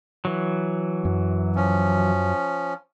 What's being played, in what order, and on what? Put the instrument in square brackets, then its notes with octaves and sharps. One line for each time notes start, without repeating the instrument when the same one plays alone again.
[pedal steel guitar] E3 F#3
[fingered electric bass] F#2
[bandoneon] F3 C#4